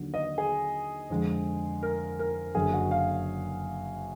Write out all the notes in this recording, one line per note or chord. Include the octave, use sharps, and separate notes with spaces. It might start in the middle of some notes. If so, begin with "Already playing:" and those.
Already playing: D#2 D3 F#3
D#5
G#4
F2 D3 G#3
A#4
A#4
F#1 F#2 D3 G#4
F#4
F5